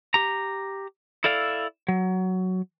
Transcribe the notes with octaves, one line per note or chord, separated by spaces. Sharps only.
G4 A#5
E4 A4 D5 F5
F#3